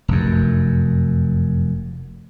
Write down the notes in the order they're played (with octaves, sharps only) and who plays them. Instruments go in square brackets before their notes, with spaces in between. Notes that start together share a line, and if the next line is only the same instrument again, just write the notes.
[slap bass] F1 F#2